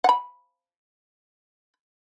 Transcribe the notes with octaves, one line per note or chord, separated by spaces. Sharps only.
F#5 B5